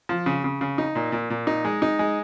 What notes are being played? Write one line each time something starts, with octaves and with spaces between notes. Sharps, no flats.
F3
C#3
C#3
C#3
D#4
A#2
A#2
A#2
D#4
G#3
D#4
G#3